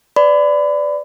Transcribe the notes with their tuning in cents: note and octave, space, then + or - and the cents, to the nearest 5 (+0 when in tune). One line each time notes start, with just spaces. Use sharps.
B4 +35 D5 +0 B5 +30